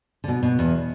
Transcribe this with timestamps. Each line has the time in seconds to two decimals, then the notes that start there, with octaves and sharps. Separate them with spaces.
0.24 D3
0.28 B2
0.43 B2
0.59 E2